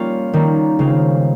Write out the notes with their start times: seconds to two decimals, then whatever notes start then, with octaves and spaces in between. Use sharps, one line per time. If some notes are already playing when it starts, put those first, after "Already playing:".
Already playing: G3 A#3 C#4 F4
0.33 D#3 G3 A#3 C#4
0.79 C#3 G#3 C4 F4